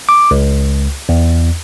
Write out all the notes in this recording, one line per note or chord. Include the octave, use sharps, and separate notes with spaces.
D6
C#2
E2